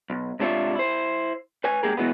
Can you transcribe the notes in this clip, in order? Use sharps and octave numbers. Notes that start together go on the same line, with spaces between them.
B1
G#2 C3 D4 F4 C#5 E5
E4 C5
B4 C#5 G#5
G#2 A#3 G4 G#4 A#4
B2 E3 F#3 G#3 B3